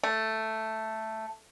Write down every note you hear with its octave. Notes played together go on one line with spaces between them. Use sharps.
A3